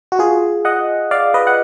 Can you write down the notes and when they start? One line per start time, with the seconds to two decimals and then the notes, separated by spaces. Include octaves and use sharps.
0.12 F#4
0.19 F4 G#4
0.65 D#5 F#5
1.11 D5 F5
1.34 B4 D#5
1.47 F#5